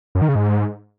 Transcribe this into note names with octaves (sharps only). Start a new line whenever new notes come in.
F#2
D#3
C#3
G#2